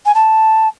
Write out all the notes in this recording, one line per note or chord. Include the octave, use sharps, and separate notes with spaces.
G#5
A5